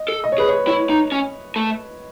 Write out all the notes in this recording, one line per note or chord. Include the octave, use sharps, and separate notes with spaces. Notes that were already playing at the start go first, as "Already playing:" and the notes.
Already playing: D#5
A4
D#5
C#5
G#4 B4
C#5
E4 C#5
D#4
C#4
A3